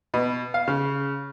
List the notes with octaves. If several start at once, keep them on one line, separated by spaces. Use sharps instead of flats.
B2
F5
C#3